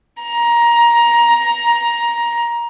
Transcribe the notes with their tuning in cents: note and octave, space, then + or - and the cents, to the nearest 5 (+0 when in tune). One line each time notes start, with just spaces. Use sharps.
A#5 +15